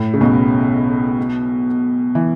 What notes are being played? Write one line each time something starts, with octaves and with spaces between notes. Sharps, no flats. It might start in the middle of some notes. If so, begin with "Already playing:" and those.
Already playing: A2
C#3
B1 B2
E3